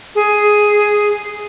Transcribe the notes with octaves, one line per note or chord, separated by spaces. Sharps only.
G#4